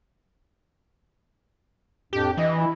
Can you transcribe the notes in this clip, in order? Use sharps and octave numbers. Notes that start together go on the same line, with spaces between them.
F2 A2 D4 G4
E3 D#5
E4